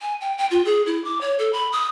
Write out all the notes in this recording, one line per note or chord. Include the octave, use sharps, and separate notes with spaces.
G#5
G5
G5
F4
G#4
E4
D6
C#5
A4
B5
D#6